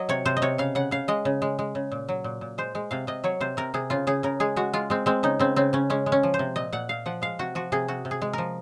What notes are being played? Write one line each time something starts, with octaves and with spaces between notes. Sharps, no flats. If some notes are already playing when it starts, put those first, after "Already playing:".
Already playing: F#3 D#5
C3 C#5
C3 C5
D#5
C3 C#5
C#3 F5
C#3 F#5
C#3 F5
G#3 D#5
C#3
G#3
G#3
C#3
A#2
F#3
A#2
A#2
G#3 C5
G#3
C3 F5
C3 D#5
F#3 C#5
C3 C5
C3 A#4
C3 G#4
C#3 F4
C#3 G#4
C#3 A#4
G#3 G#4
G#3 F#4
G#3 F4
G#3 C4
G#3 C4
C#3 D#4
C#3 C4
C#3 C4
C#3 C#4
G#3 C#4
G#3
C#4
F3
C5
C3
A#2 D#5
A#2 F#5
A#2 F5
F3 F#5
G#3 F5
C3 F#4
F3 F#4
C3 G#4
C3 F#4
C3
G#4
G#3
F3 A#4